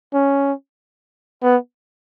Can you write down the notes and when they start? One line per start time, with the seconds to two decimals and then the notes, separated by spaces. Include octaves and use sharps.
0.13 C#4
1.43 B3